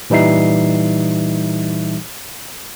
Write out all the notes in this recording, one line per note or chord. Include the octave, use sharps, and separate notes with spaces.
A#2 E3 G3 D#4 E5 C7